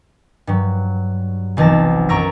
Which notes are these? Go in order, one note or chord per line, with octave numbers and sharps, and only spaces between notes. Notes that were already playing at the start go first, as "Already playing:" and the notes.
G2 F#3
F1 B1 E3 A5 A#6
F#2 A#5 C#6 E6 A#6 D7